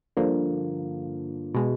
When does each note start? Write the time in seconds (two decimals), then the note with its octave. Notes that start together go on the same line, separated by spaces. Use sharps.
0.17 G2 D3 F3 A#3
1.54 B2 G#3